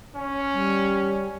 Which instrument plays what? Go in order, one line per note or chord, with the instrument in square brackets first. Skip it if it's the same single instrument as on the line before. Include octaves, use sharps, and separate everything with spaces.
[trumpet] C#4
[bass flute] G3